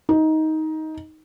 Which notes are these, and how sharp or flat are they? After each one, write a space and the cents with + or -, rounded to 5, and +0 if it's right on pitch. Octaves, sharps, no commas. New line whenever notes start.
D#4 +15